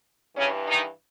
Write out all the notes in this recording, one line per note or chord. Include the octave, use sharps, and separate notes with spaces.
G2 C#3 E3 C#4
D#3 D#4